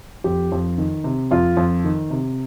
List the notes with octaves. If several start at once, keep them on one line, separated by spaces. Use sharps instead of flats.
F2 G4
F2
D#3
C3
F2 F4
F2
D#3
C3